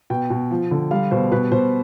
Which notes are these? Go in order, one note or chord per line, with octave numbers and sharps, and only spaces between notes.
B2 G5
B2
F3
D3
G3 F5
B2 C5
B2 B4
B2 C5